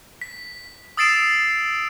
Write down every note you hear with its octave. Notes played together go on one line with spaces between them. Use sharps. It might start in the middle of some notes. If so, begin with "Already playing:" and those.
B6
D#6 E6 A6 C7 D7 E7